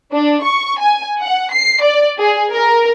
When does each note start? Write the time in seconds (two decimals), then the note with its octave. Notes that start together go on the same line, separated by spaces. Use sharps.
0.12 D4
0.43 C#6
0.79 G#5
1.20 F#5
1.52 C7
1.82 D5
2.17 G#4
2.52 A#4